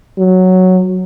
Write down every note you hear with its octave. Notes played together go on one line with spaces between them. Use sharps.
F#3